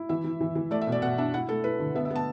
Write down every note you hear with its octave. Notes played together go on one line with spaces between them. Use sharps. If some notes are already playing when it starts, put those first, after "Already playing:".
Already playing: E4
E3 E5
E3
E3
E3
A3 D5
E5
B2
D5
B2 F#5
D4 E5
E4 F#5
A3 A4
E4 B4
D3
B3 E5
E5
B3
A5